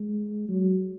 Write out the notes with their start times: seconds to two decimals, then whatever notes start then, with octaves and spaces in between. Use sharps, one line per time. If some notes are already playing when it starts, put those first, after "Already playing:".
Already playing: G#3
0.48 F#3